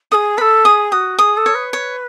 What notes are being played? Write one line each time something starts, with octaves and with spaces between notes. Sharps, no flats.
G#4 A4 D#6
A4 B4 B5
G#4 D#6
F#4 D#6
G#4 D#6
A4
C#5
B4
C#5